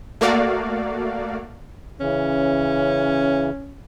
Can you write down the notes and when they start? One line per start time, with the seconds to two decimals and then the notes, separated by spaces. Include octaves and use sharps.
0.21 A3 A#3 F#4 D5 F5
2.00 C#3 E3 C#4